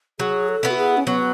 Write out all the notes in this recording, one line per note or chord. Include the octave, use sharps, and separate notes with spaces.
F#3 G#4
A4
B3 E4
F#4
G#4
C#4
F#3 B3